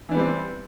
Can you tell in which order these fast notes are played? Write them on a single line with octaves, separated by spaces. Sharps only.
E3 D4 B3 G3 C4